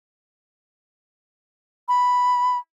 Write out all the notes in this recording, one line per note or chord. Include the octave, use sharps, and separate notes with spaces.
B5